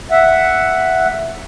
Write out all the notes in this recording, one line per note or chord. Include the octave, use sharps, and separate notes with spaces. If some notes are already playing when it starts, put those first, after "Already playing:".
E5 F#5